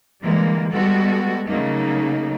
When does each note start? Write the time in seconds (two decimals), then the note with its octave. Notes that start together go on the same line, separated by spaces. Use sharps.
0.23 D3 E3 G3 G#3 A#3
0.73 G3 G#3 B3 F#4 A4
1.46 C#3 F#3 A3 A#3 D#4